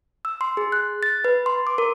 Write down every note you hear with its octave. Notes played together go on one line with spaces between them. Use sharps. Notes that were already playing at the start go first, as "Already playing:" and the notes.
E6
C6
G#4
F#6
A6
B4
C6
D6
A#4